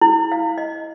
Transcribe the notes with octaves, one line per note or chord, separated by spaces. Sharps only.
E4
F5
D#5